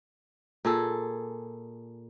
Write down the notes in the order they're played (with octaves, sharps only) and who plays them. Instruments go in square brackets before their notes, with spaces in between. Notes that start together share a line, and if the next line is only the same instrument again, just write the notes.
[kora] A#2 G#4 A4